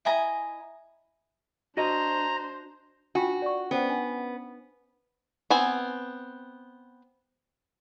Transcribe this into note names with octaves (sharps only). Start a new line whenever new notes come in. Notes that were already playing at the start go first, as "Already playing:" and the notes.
E4 D#5 G#5 A#5
D4 F#4 C5 D#5 A#5
D4 F4 F#4 G5
D5 C#6
B3 C#4 C5 F#5
D4
B3 C4 G#5